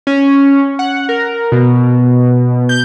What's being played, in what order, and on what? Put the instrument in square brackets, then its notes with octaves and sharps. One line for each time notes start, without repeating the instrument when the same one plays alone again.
[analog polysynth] C#4
F#5
A#4
B2
G6